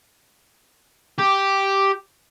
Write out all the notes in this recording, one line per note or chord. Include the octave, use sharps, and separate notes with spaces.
G4